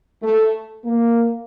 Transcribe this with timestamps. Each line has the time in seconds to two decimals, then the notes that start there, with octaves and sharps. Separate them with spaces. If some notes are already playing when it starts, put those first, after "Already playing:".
0.23 A3
0.85 A#3